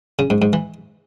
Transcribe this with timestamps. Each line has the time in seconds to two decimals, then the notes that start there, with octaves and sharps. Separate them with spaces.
0.19 C#3
0.30 G#2
0.42 G#2
0.53 E3